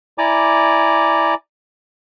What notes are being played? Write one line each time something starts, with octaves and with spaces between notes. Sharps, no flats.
E4 D5 G#5 A#5 D6